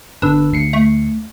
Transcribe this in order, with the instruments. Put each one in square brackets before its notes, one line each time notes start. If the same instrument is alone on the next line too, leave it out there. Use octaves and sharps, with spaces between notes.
[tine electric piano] G1 B4 E6 [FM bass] D4
[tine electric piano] D2 C7 C#7
[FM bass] A3